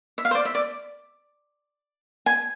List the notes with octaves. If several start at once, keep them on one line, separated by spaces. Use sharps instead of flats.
E5
F5
C5
D5
E5
D5
G#5